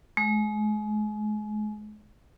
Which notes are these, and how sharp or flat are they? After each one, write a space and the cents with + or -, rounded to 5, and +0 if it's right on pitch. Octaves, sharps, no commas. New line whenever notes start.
G#3 +35